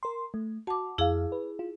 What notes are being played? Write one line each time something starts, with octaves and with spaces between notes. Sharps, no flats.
A#4 C6
A3
F#4 A5 D6
F2 E4 G#4 F5
B4
F4